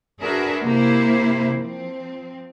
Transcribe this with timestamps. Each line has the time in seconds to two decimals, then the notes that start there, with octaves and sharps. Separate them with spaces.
0.20 D4 F#4 G#4 A#4 B4 E5
0.64 C3 A#3 E4 C5
1.54 F3 C4